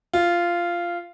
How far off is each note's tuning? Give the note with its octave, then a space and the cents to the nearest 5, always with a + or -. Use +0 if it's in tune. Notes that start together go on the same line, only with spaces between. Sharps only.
F4 -10